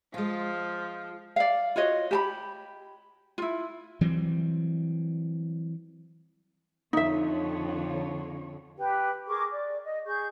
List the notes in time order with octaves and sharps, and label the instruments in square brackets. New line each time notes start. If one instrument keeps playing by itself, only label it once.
[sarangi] F3 [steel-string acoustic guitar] G#3 F4
[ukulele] D5 F5
F4 F#4 C#5 D#5
G4 A5 B5
E4 F4
[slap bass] E3 F#3 G3 C4
[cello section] F2 D3 C#5 [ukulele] D#4 E5
[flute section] G4 B4 G5
G#4 A#4 C#6 D6
D5
D#5
G#4 C#6 G6